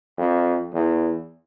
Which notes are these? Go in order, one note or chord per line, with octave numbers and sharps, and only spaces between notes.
F2
E2